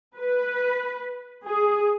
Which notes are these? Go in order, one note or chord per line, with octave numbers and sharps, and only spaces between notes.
B4
G#4